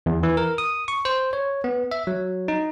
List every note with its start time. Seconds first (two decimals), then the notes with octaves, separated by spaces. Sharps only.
0.06 E2
0.23 E3
0.37 A#4
0.58 D#6
0.88 C#6
1.05 C5
1.33 C#5
1.64 B3
1.91 E5
2.07 F#3
2.48 D#4